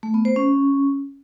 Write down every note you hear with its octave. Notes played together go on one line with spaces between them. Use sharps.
A3
B3
C5
C#4